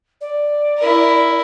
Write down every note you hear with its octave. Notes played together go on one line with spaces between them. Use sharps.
D5
E4 A#4